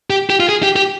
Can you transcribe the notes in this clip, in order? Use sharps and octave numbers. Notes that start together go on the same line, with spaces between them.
G4
G4
F4
G#4
G4
G4